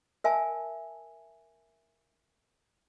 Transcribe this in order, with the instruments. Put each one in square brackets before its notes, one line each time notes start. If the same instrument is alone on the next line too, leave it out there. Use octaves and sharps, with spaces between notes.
[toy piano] A#4 E5 G#5 A5